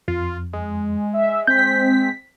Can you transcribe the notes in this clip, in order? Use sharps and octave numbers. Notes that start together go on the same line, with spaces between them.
F2 F4
G#3
E5
C4 G6 B6